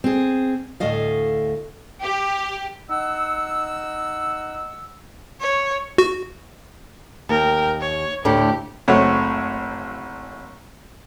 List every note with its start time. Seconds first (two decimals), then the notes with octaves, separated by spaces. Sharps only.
0.04 C4 G#4
0.80 D2 A2 A3 D#5 F5
2.02 G4
2.90 D#4 F#5 E6
5.41 C#5
5.98 F#4
7.29 D#2 A#4 G5
7.80 C#5
8.25 D2 A2 D3 G4
8.88 F#1 A3 C4 F#4 C#5